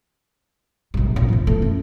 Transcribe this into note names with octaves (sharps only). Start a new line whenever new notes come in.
A#1 G2
A#1 A2
F1 F3
E3 A3
F#2